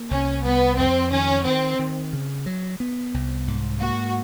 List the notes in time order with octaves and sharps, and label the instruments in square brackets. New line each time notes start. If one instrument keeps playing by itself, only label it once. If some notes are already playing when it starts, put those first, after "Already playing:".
Already playing: [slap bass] A#3
[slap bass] C2 [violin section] C#4
[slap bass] C2 [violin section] B3
[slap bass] F2 [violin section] C4
[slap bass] D#3 [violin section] C#4
[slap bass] D#3 [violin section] C4
[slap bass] D#3
C#3
F#3
B3
C2
G#2
[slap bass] A#3 [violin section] F#4